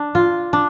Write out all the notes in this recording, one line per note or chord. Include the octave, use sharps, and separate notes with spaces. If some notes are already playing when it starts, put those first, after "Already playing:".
Already playing: D4
F4
D4